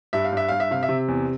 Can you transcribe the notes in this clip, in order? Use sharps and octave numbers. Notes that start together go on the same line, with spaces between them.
G2 E5
F5
G2 E5
G2 F5
E5
C3 F5
E5
C3
E2